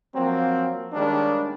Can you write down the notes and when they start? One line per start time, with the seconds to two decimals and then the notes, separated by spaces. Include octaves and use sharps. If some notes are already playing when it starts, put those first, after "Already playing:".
0.15 F3 F#3 A#3 C4
0.93 D#3 G3 G#3 A#3 C#4 D4